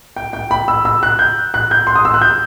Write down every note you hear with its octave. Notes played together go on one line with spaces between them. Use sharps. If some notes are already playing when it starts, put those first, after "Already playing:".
G5
G5
B5
E6
E6
F#6
G6
F#6
G6
C6
D#6
E6
F#6
G6